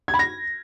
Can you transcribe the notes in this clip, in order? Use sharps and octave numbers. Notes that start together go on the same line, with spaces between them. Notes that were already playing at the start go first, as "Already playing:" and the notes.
G#6
B5
A#6